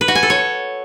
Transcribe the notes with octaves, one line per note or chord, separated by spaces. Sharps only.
B4
F#4
G#5
A4
C#5